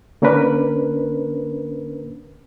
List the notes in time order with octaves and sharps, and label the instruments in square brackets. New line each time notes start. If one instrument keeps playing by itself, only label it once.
[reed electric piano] D3 A#3 C#4 D4 A#4 B4